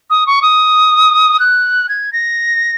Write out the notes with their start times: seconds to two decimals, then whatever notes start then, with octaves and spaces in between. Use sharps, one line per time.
0.10 D#6
0.27 C#6
0.42 D#6
1.40 F#6
1.89 G#6
2.13 A#6